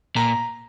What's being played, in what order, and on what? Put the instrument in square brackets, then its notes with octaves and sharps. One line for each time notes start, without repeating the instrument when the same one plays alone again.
[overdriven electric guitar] A#2 [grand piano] A#5